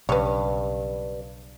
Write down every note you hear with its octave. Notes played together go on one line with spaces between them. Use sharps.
B1 G2 C#3 B4 C#5